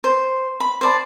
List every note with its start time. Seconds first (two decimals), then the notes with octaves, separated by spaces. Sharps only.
0.04 C5
0.60 B5
0.81 C5 D5 A5